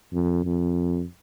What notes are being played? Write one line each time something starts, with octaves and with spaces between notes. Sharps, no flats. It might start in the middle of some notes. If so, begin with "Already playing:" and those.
F2
F2